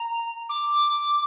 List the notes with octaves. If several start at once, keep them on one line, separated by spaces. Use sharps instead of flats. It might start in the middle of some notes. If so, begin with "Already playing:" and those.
Already playing: A#5
D6